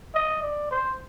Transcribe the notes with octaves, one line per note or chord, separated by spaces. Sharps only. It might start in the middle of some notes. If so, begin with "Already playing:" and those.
D#5
D5
C5